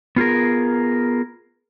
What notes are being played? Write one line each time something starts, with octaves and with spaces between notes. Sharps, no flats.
B3 F4 G#4 A#4